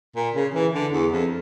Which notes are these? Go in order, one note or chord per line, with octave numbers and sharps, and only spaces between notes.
A#2
C#3
E3
D3
E2
F2